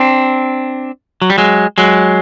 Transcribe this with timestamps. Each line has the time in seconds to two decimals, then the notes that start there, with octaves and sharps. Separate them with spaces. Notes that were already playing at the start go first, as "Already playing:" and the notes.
Already playing: C4 D4
1.22 F#3
1.30 G3
1.38 F#3 G#3
1.78 F#3 G#3